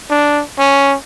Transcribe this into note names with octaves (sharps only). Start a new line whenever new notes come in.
D4
C#4